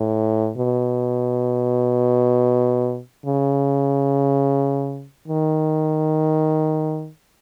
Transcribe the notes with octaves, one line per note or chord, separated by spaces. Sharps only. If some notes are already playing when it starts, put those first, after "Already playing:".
Already playing: A2
B2
C#3
D#3